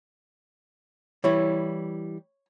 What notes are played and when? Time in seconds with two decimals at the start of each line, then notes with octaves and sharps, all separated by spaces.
1.24 E3 G3 E4 C#5